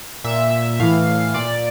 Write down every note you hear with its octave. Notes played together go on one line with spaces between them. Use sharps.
A#2 E5
A2 E3 F5
A#2 D5